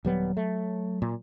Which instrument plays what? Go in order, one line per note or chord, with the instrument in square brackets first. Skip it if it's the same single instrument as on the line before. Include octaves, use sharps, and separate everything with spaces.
[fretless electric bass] D#1 G3 B3 [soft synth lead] F#3
[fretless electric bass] A3
A#2